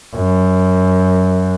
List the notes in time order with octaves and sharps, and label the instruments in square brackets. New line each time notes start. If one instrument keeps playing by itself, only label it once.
[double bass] F#2